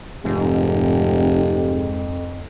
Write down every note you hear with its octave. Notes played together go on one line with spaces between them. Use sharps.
F1 F2 G#2 G4